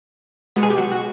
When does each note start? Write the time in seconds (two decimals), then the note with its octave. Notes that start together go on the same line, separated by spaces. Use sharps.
0.56 B2 G#3 B3
0.63 G#4
0.70 G4
0.78 F#3 F#4
0.92 F#4